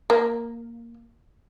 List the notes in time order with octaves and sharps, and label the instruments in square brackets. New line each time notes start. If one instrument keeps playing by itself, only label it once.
[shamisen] A#3